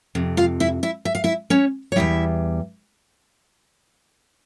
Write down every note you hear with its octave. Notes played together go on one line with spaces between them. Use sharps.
F2 C3
F4 F5
E4 E5
E4 E5
E5
F5
E4 E5
C#4 C#5
C#5
E2 C3 G3 E4 E5